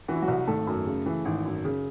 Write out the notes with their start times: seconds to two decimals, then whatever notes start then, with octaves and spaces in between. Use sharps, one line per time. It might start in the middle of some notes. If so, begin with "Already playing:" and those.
0.08 E3 F#4
0.15 E4
0.22 F#3 F#4
0.28 C2
0.47 G#1 A3 A4
0.67 F#2
0.87 C#3
1.06 E3
1.25 G#1
1.45 F#2
1.65 C#3